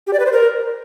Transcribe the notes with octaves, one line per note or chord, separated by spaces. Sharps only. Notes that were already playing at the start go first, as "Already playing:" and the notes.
G4
D5
B4
C5
A#4